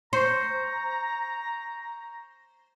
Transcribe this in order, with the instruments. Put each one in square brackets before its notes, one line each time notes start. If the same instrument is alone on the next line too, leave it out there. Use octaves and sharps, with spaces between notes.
[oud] C5 [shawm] A#5 [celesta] C#6 G6 C#7